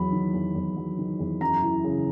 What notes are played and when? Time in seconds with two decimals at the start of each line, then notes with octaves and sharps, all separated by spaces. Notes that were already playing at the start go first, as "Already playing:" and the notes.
Already playing: E2 F#3 B5
0.12 D#3
0.34 E2
0.55 E2
0.77 F#3
0.98 D#3
1.19 E2
1.41 F#2 A#5
1.62 E3
1.84 C#3